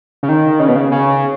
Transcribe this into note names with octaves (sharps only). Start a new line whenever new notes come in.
C#3
D#3
C#3
B2
C#3
C#3